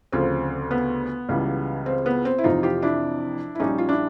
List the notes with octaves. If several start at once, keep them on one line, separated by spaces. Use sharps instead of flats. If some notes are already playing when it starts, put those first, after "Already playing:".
D2 C#3 F3 C4
B3
C#2 C#3 E3 G3
C4
B3
C4
E4
F2 C3 E3 D#4 F4
F4 G4
D4 E4
E4
A#1 A#2 G3 C#4 D#4
F4
D4 E4